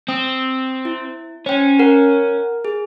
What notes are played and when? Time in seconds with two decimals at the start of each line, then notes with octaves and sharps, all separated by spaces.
0.09 C4 D#6
0.85 E4
1.46 C#4 C5 G5
1.79 A#4 F#5
2.65 G#4